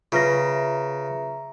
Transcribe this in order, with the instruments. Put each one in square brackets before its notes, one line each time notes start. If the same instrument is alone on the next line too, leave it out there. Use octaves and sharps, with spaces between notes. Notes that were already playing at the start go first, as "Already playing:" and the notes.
[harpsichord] C#3 [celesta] F4 B4 A#6 [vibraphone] E5 A#5